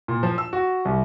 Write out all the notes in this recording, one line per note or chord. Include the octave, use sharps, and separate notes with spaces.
A#2
F3
E6
F#4
C2